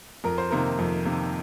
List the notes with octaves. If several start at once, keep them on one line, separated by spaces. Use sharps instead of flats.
F2 A#4
C5
C3 D#3 A#3 A#4
F2
C3 D#3 A#3